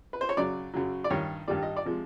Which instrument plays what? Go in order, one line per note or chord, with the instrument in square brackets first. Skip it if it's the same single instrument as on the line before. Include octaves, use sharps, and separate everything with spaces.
[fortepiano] B4
C5
C#5
F#2 C#3 F#3 D5
F#2 C#3 F#3
D5
G2 D#3 G3 C#5
G2 D#3 G3 D5
D#5
D5
C3 F3 G#3